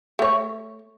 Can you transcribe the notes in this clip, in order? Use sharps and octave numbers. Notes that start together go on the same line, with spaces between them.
A3 C#5